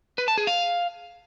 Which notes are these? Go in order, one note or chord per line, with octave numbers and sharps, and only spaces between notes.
B4
A5
G#4
F5